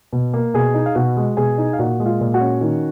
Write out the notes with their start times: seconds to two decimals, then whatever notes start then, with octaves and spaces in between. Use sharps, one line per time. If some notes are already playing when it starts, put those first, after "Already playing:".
0.13 B2
0.34 A#3
0.54 B2 G#4 G#5
0.74 D#4
0.86 F5
0.95 B2 F#4 F#5
1.17 G#3
1.37 B2 G#4 G#5
1.58 D#4
1.73 F5
1.79 A#2 F#4 F#5
2.00 G#3
2.06 F4 F5
2.21 A#2
2.34 F#4 F#5
2.40 C#4
2.61 D#3